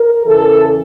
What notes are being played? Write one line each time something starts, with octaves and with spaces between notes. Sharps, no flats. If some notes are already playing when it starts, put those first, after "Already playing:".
Already playing: A#4
E2 C#3 E3 A4